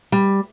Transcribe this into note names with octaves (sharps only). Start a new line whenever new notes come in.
G3